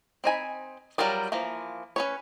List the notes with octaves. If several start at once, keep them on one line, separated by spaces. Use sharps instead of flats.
C4 D#4 G#5 B5
F#3 G3 F4 A#4 D5
E3 F3 A#3
C#4 B4 C#5